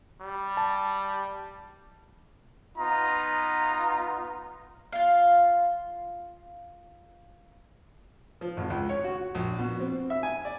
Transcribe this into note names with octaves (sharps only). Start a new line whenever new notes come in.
G3
A5
B3 D#4 F4 A#5
F4 F5
F3
G#1
C#2
C#5
F#4
A#1
B2
C4
E5
G#5
D5